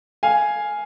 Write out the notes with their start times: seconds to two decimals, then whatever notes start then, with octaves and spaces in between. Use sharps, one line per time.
0.23 F5 G#5